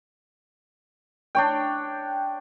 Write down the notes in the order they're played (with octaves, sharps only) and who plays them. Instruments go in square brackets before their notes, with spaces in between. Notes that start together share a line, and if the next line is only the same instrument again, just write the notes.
[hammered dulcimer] D4 C#5 G5